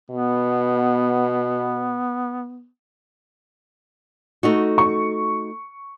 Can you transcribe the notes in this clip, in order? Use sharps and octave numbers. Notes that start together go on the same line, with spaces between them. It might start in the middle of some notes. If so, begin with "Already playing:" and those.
B2 B3
A3 D#4 F#4
C#6